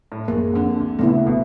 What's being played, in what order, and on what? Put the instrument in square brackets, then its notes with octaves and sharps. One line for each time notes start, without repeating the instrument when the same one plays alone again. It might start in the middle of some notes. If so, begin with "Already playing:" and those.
[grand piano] A2
[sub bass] A1 [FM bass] F#2 [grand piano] G#3 [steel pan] A#3
[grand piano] F2 D3
[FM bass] D2
[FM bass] A#2 [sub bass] C#3 [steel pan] A3 B3 E4
[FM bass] A#1 [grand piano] B2